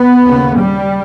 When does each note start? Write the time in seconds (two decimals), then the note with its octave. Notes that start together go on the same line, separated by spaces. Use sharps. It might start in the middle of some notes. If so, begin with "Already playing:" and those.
Already playing: B3
0.23 D#2 C#3
0.56 G3